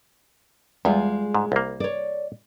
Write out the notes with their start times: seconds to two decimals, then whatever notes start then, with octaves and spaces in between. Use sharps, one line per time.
0.85 E2 G3 G#3 F4
1.35 G#2
1.52 C2 A#3
1.80 C#5 D5